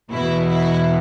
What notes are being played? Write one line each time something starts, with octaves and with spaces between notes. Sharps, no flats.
E2 B2 E4
E4